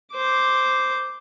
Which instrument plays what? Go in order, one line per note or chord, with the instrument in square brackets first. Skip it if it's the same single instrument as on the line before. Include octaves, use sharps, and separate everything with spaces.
[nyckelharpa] C5 D6